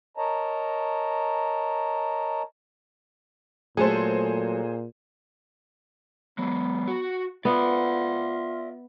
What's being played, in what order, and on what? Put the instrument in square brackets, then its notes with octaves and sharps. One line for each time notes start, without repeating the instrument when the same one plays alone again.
[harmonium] A#4 C#5 D#5 A5 A#5
[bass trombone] A#2 [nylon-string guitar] F#3 A3 A4 [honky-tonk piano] G#4 C5
[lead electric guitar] F#3 G#3 [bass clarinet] B3
[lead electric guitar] F#4
[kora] B3 [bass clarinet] F4 [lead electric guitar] D5 E5